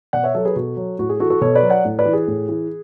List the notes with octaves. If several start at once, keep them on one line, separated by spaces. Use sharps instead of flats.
B2 D5 F#5
C#5 E5
F#3 A4 C#5
G#4 B4
B2 F#4 A4
F#3
A2 F#4
G#4
E3 F#4 A4
F#4 A4
B2 A4 C#5
B4 D5
F#3
D5 F#5
A2
B4 D5
E3
G#4
A2
E3